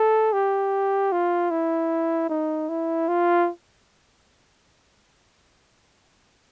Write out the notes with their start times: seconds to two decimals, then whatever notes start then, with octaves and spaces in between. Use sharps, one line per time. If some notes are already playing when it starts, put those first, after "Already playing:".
Already playing: A4
0.33 G4
1.12 F4
1.51 E4
2.29 D#4
2.69 E4
3.08 F4